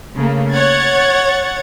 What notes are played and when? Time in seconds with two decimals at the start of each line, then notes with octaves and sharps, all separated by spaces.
0.14 C#3 A3 A#3
0.53 C#5 F#5 G#6 A6